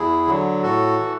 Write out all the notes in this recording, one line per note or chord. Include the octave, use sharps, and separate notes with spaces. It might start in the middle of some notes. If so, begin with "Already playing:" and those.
Already playing: E2 E4 G#4
D3 F#3
A2 F#4 A4
E3